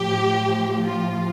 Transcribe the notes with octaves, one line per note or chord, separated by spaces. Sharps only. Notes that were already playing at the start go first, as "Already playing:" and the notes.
Already playing: A2 F3 G4
F4